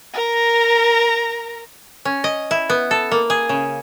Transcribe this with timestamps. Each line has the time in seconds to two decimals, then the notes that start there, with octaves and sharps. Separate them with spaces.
0.13 A#4 A#5
2.05 C#4
2.24 D#5
2.51 E4
2.69 B3
2.91 A4
3.11 A#3
3.30 G#4
3.49 C#3